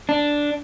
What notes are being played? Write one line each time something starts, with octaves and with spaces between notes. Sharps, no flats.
D4